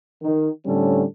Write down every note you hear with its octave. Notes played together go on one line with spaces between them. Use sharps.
D#3
A2 D3 G3 C4 C#4 A4